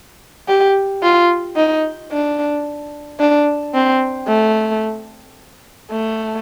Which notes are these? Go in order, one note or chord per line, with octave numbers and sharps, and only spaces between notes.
G4
F4
D#4
D4
D4
C4
A3
A3